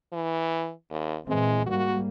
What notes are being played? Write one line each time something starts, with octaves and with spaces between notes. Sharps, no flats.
E3
D#2
A#2 E3 G#3 C4
G#2 G3 A#3 F#4